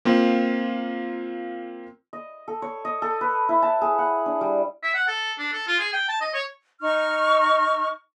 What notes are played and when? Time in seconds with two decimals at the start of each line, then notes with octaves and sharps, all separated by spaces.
0.05 A#3 C4 F4
2.13 D#5
2.48 A4
2.62 C#5
2.85 D#5
3.02 A4
3.21 B4
3.49 E4
3.62 A5
3.81 G#4
3.98 F#5
4.26 D4
4.41 G3
4.83 E5
4.94 F#5
5.08 A4
5.39 D4
5.52 A4
5.67 F4
5.79 G#4
5.93 G5
6.08 A5
6.21 D#5
6.34 C#5
6.81 D#4 C#6 F6